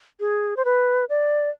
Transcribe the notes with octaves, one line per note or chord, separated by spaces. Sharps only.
G#4
C5
B4
D5